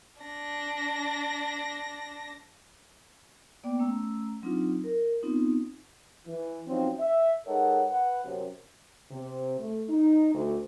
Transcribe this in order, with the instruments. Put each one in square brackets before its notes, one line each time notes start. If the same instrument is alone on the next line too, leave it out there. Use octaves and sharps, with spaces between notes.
[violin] D4 A#6
[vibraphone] A#3 B3 D5 G5 D6
A3 C#4 A#5 E6
F#3 C4 D4 D#4 F4
A#4
B3 C4 D#4 F4
[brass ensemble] E3
B2 F3 F#3 C4 C#4 D#4
E5
G#3 D#4 A4 A#4 C#5 F#5
B4 F#5
F#2 C3
[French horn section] C3
A3
D#4
D2